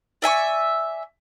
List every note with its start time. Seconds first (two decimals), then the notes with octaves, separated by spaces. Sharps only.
0.22 D5 E5 G#5 C#6